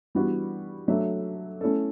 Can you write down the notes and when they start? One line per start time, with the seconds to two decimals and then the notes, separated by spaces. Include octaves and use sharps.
0.15 E3 G3 B3 D4 F#4
0.88 F#3 A3 D4 A4 E5
1.61 A3 C#4 E4 A4